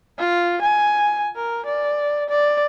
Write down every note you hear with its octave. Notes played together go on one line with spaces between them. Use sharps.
F4
G#5
A#4
D5
D5